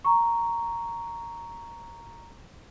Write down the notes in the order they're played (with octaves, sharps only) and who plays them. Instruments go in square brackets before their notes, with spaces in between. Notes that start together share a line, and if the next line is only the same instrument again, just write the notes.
[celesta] A#5 C#6